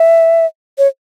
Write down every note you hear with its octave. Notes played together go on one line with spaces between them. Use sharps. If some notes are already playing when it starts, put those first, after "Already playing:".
Already playing: E5
C#5